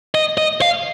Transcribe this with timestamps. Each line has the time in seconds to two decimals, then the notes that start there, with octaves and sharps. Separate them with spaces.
0.15 D#5
0.38 D#5
0.62 F5